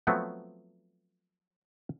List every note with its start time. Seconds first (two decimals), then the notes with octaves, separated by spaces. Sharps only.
0.07 F3 F#3 A3 B3 C4